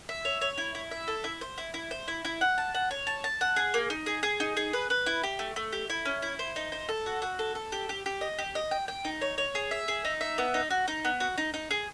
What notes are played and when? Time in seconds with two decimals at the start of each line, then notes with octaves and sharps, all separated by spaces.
0.09 E5
0.25 C#5
0.41 C#5
0.58 E4
0.75 E4
0.91 E5
1.08 A4
1.24 E4
1.41 C5
1.58 E4
1.74 E4
1.91 C5
2.08 E4
2.25 E4
2.41 F#5
2.58 A5
2.75 F#5
2.91 C#5
3.07 A5
3.24 A5
3.41 F#5
3.56 G#4
3.74 A#3
3.90 D#4
4.06 G#4
4.23 G#4
4.40 D#4
4.57 G#4
4.73 B4
4.90 B4
5.06 E4
5.23 G4
5.39 A3
5.56 A3
5.73 G4
5.90 E4
6.05 C#4
6.22 E4
6.39 C5
6.56 D#4
6.72 C5
6.89 A4
7.06 F#4
7.22 F#4
7.39 A4
7.55 A4
7.72 G4
7.89 G4
8.06 G4
8.21 D#5
8.39 G4
8.55 D#5
8.71 G5
8.88 G5
9.05 D#4
9.21 C#5
9.38 C#5
9.55 G#4
9.71 E5
9.88 G#4
10.05 D#4
10.21 E5
10.38 B3
10.54 D#4
10.70 F#4
10.88 D#4
11.05 B3
11.20 F#4
11.38 D#4
11.54 D#4
11.71 G#4